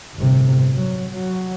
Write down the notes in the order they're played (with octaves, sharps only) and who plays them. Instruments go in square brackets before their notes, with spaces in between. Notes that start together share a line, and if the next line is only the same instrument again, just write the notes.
[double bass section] G1 A2 C3
F#3
F#3